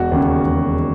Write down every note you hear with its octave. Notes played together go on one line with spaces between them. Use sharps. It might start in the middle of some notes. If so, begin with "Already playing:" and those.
Already playing: E1 F#4
D#2 C#3
E1